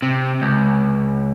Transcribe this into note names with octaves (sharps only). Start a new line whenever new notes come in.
C3
C#2